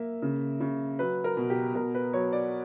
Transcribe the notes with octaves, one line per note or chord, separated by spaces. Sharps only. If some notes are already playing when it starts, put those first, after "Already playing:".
Already playing: A#3 E5
C#3
C#3
F#3 B4
A#4
B2
G4
B2 A#4
B4
F#3 C#5
D5